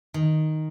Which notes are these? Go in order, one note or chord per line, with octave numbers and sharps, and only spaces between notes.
D#3